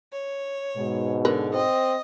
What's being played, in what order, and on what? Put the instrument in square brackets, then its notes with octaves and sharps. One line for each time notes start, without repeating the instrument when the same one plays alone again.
[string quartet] C#5
[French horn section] G#2 B2 G#3
[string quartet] D3 [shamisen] A#4 B4
[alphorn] C4 [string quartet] D#5